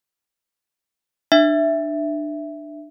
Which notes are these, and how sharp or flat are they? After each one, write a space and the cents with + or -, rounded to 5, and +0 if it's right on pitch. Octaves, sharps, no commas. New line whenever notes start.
D4 +25 E5 +0